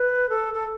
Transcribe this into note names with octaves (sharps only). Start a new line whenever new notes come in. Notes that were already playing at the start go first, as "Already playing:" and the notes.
Already playing: B4
A4
A4